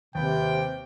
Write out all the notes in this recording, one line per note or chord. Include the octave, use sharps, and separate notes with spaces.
D#2 C3 B4 G5